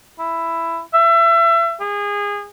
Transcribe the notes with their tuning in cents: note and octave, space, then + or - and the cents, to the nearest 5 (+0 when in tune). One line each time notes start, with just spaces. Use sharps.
E4 +10
E5 +30
G#4 -25